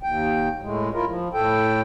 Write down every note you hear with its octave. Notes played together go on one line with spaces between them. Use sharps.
D#2 G5
A2 G#3
E4 F4 A#4
F3
A2 A4 G5